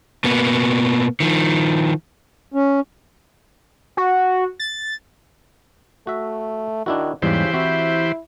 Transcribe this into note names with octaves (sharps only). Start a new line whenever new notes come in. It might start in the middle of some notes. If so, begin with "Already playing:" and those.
B2 A#3 B3
D#3 F3
C#4
F#4
A6
A3 F#4 E5
D#3 D4 E4 F#4
E2 G#2 C#3 E3 G3 G4 C5
C4 E4 F#4